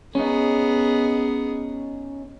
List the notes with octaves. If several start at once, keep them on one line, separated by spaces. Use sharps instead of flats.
B3 C#4 D#4 G#4